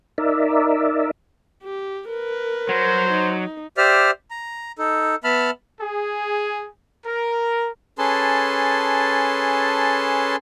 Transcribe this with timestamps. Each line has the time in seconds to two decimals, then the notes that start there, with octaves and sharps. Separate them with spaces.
0.18 D#4 A#4 D5 E5
1.63 G4
2.10 A#4 B4
2.69 F#3 C5
3.09 D#4
3.77 G4 C5 D5 E5 F6
4.31 A#5
4.79 D#4 A4
5.24 B3 E5 A5 B5 F6
5.81 G#4
7.06 A#4
7.98 C#4 G#4 A4 B4 A5 C6